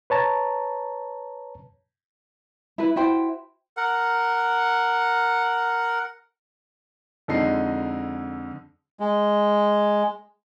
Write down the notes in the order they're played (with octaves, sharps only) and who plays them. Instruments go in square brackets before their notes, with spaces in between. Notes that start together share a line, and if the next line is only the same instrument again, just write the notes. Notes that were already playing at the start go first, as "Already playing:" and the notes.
[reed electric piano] B4 C#5 A5 A#5
[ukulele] E4 B4
E4 F#4 C5 G5
[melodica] A#4 F#5
[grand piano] F2 D3 G#3 D#4 C7
[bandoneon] G#3